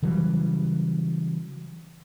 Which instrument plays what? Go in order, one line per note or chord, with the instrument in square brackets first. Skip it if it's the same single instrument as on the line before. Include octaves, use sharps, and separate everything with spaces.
[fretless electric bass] C#3 E3 F#3 G3